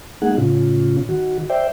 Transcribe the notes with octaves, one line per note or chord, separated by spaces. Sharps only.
G#3 A#3 D#4 G#4 F#5
A2 C#3 C#4 F4
D#3 F#4
C5 D5 E5 G5